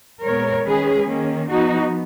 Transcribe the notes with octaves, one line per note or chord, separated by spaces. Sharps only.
A#2 G#3 B3 A#4 C#5
D#3 G#3 C#4 G#4 B4
D#3 A#3 C#4
F3 B3 D#4 F#4